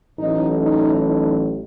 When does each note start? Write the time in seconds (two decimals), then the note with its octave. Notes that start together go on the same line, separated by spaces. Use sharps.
0.18 A1 A2 F#3 D#4
0.62 D#4
1.05 D#4